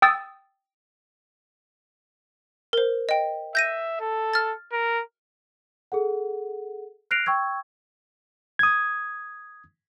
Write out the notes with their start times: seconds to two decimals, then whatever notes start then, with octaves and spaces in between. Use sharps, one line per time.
0.02 G5 D#6 E6 A6
2.73 A#4 C5
3.09 D#5 G5
3.55 E5 G6 A#6 D#7
4.00 A4
4.33 F6 A6
4.72 A#4
5.92 G#4 A4 F#5
7.11 F6 F#6 A#6 C7 D7 F7
7.26 G5 C#6 E6 G#6
8.59 D#6 G#6